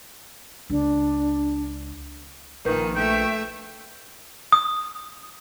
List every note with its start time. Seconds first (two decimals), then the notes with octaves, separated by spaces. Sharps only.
0.70 C#2 B3 D4
2.65 A#1 A#2 D#3 A#4 B4 G6
2.96 A3 E5 G5
4.52 D#6